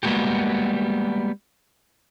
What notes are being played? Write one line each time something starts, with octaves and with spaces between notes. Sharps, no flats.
G3 G#3 A#3 B3 F#4 G4